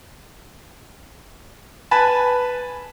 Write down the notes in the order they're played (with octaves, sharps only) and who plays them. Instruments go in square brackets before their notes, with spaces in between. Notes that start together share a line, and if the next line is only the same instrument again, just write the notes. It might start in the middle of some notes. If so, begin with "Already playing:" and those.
[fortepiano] B4 G#5 A5 B5